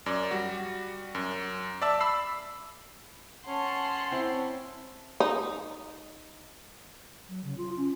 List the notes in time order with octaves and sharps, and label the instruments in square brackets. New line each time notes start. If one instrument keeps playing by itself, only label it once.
[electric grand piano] F#2 D5
G3 F#4
F#2
D5 E5 A5 E6
B5 E6 C7
[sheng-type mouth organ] C#4 C#5 [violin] F#5 C6 [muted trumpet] A5
[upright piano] C4 E4
[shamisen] D#4
[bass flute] F#3
C#3
F4
C#4